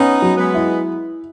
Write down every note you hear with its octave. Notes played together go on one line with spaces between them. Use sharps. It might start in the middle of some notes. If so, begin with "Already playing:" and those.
Already playing: B3 C#4 D#4
F#3
G#3 B3
E4